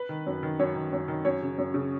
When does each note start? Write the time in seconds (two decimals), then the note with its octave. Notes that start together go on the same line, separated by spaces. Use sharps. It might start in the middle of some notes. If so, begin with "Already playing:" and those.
Already playing: B4
0.09 D#3
0.26 F#2
0.43 D#3
0.59 F#2 C#5
0.75 D#3
0.93 F#2
1.08 D#3
1.25 F#2 C#5
1.41 C#3
1.58 F#2
1.74 C#3